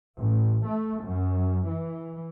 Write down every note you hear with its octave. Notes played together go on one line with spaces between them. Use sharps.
A1
A3
F#2
E3